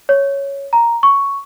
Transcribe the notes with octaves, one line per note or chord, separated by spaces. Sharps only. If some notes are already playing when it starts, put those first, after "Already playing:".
C#5
A#5
C#6